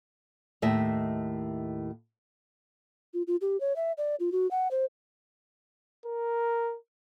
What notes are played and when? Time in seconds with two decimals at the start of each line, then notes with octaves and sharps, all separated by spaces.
0.62 D#2 A2 D#5 E5
3.14 F4
3.27 F4
3.41 G4
3.60 C#5
3.76 E5
3.98 D5
4.20 F4
4.32 F#4
4.51 F#5
4.71 C5
6.06 A#4